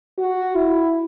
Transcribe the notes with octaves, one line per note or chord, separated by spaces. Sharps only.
F#4
E4